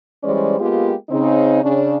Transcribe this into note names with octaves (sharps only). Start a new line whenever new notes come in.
E3 G3 G#3 C#4 C5 D5
G#3 A#3 B3 F4 G4
C#3 C4 D#4
C#3 C#4 D4